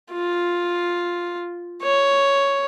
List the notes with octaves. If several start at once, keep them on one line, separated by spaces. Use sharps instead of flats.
F4
C#5